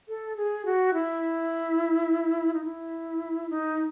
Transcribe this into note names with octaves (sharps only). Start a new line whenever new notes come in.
A4
G#4
F#4
E4
D#4
E4
D#4